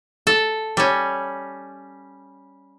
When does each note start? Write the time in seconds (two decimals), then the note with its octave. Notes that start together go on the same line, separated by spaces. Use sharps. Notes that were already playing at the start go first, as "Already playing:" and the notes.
0.27 A4
0.77 G3 C#4